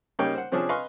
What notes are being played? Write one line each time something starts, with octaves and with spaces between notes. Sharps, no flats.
C#3 G3 A#3 D#4 C#5 G5
C5 F#5
C3 F3 C#4 D4 G#4
B4 D#5 F5 G#5 C6 C#6